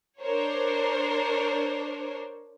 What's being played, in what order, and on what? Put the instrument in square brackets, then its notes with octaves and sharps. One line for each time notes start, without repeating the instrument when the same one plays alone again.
[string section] D4 A#4 C5 C#5